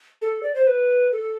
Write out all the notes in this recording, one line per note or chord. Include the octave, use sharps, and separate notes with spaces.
A4
D5
C5
B4
A4